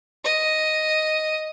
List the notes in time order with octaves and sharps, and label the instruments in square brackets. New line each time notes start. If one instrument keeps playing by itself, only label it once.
[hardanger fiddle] D#5